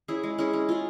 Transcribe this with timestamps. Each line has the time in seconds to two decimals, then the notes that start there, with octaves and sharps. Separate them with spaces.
0.08 C#4 E4 G#4
0.23 G#3
0.38 C#4 E4 G#4
0.53 C#4
0.69 F4 G#4